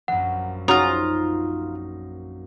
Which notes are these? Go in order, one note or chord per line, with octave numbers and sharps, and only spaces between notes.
A#1 F#2 F#5
C4 C#4 D#4 F4 F#4 A#5 D#6